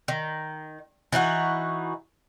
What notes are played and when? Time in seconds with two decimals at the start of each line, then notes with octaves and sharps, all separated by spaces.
0.08 D#3
1.12 E3 D#4 F4 F#4